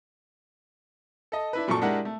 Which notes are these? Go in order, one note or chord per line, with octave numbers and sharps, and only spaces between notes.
A4 D#5
D4 E4 B4
F#2 A#2 F#3 A4 C#6
G#3 D4 E4 G4 A#4 F#5
A3